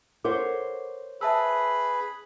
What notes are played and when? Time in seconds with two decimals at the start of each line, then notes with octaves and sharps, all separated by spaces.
0.24 A4 A#4 C5 C#5 F#5 D6
1.21 G#4 B4 E5 A5 B5 E6